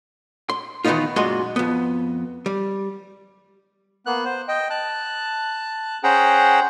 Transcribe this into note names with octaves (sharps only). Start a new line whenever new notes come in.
C6
D#3 E3 G3 B3 D#4 F4
F#2 A#2 G#3 F#4 D#5 C6
F2 B3
G3
A#3 B3 F#6
C5
D#5 G5
A5 F#6
C#4 G#4 C5 F#5 G5 A#5